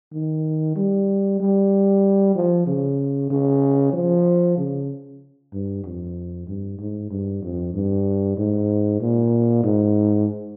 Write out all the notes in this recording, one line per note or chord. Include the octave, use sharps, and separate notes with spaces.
D#3
G3
G3
F3
C#3
C#3
F3
C#3
G2
F2
G2
G#2
G2
F2
G2
G#2
A#2
G#2